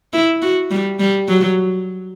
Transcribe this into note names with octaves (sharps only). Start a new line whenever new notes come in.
E4
F#4
G3
G3
F#3